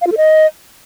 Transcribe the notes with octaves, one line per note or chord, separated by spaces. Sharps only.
F5
F4
A4
D#5